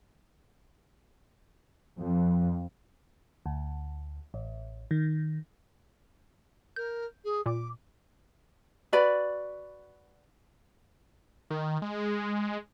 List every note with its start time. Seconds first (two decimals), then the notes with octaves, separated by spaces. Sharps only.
1.98 F2
3.46 D2
4.34 A1
4.91 D#3
6.76 A#4 G6
7.24 G#4
7.46 A#2 D6
8.93 F#4 B4 D5 B5
11.50 D#3
11.82 G#3